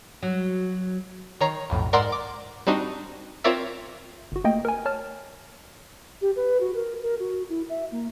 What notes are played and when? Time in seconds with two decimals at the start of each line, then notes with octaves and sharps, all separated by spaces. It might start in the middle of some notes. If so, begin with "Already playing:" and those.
0.23 F#3
1.41 D#3 C#5 A#5 C7
1.70 B1 F2 A2
1.93 G#2 A#4 D5 F#5 C6 E6
2.12 D6
2.67 G3 C4 D4 D#4 F#4
3.44 C4 F4 A#4 C#5 D5 E5
4.32 G1 F#4
4.44 A3 A#3 D#5 G5
4.65 A#4 G#5
4.86 C#5 A5 F6
6.22 G4
6.36 B4
6.61 F#4
6.75 A#4
7.02 A#4
7.20 F#4
7.49 E4
7.69 E5
7.92 A#3